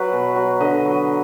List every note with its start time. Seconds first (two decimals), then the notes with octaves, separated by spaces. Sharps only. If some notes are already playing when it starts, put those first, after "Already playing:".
Already playing: F#3 B4
0.12 B2
0.36 F#3
0.60 D3 D#5
0.85 F#3